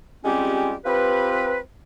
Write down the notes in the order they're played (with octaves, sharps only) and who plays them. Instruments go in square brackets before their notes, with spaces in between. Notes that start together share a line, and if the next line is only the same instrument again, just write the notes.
[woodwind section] G3 G#3 C4 C#4 F4 G4
C4 F4 G4 B4